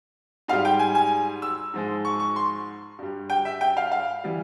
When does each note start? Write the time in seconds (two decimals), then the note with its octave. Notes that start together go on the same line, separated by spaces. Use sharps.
0.48 G#2 F5
0.53 G3
0.65 G5
0.79 G#5
0.95 G#5
1.42 E6
1.74 G#2 F3 G#3
2.05 C#6
2.20 C#6
2.36 C6
2.99 G2 G3
3.30 G5
3.45 E5
3.61 G5
3.77 F5
3.92 F5
4.24 E3 G3